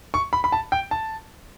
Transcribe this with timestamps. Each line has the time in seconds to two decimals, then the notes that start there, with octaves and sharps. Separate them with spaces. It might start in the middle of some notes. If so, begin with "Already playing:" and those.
0.14 C#6
0.33 B5
0.44 B5
0.52 A5
0.72 G5
0.91 A5